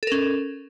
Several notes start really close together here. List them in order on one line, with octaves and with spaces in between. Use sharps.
A4 A#4 C#4